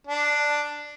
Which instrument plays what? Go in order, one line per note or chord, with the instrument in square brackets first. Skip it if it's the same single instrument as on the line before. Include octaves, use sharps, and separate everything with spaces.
[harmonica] D4